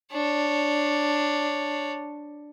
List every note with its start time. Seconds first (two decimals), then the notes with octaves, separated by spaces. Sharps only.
0.12 D4 C#5